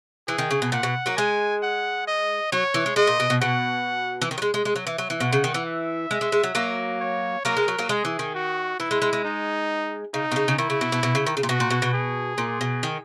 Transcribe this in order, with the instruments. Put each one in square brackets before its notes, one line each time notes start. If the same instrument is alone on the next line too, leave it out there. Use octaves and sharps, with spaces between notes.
[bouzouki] E3 [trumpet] G#4
[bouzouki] D#3
C#3
B2
[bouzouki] A#2 [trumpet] F#5
[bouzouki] B2
F#3 A#3
[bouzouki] G#3 [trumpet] G#5
[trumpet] F#5
D#5
[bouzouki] F#3 [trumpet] C#5
[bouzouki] E3
G#3
[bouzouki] G#3 [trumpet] D#5
[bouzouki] A#2
B2
B2
[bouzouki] B2 [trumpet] F#5
[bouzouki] E3
D#3
F#3
G#3
G#3
G#3
F#3
E3
F#3
E3
[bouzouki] B2 [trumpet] F#5
[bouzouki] C#3
D#3
E3
[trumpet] E5
[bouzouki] G#3
G#3
G#3
F#3
F#3 A#3
[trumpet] C#5
[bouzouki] F#3 A#3 [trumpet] A#4
[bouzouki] G#3
F#3
F#3 A#3
[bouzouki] G#3 [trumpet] G#4
[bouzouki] E3
D#3
[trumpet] F#4
[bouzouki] E3 [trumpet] E4
[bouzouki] G#3
G#3
G#3
[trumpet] D#4
[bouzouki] C#3 [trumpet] D#4
[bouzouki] B2
C#3
C#3
[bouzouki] D#3 [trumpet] E4
[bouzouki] C#3
B2
B2
B2
C#3
D#3
C#3
A#2
[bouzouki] B2 [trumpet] F#4
[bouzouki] A#2
B2
B2
[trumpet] G#4
[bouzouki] A#2
B2
D#3